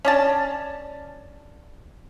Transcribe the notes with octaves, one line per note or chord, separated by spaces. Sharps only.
C#4 D4 A5